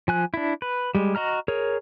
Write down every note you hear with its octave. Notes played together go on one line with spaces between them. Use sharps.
F3 G#5 F#6
D4 E4
B4
G3 G#3
F#4 D#5 A#5 F6
G#4 A#4 C#5